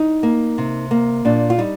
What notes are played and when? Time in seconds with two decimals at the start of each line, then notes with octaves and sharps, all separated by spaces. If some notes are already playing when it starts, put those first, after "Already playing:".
Already playing: D#4
0.23 A#3
0.58 C3
0.91 A#3
1.25 A#2 D4
1.50 F4
1.58 G3 D#4